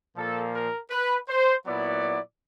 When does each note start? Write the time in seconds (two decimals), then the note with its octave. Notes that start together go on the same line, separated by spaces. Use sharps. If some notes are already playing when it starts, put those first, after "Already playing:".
0.16 A#2 F3 A#3 A4
0.54 A#4
0.90 B4
1.29 C5
1.66 A#2 F#3 B3 E4 D5